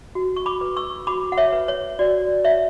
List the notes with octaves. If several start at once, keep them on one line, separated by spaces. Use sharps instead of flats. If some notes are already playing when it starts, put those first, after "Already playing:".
F#4
C#6
B5 D6
B4
C#6 E6
F#4 B5 D6
F#5
C#5 E5
B4
C#5
F#4 D5
C#5 E5